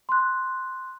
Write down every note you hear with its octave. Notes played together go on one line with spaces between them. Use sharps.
C6 F#6